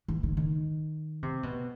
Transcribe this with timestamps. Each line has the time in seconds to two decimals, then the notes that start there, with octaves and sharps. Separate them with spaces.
0.08 E3
0.23 D#3
0.37 D#3
1.23 C3
1.43 B2